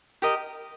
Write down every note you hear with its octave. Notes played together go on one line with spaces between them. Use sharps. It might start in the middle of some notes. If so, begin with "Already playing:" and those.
G4 A#4 D#5